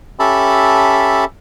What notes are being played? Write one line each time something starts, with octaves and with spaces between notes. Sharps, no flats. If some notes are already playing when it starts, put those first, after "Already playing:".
C#4 G4 A4 E5 A5 B5